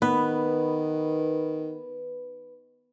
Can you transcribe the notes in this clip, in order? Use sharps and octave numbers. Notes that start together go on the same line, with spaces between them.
D#3 B3 B4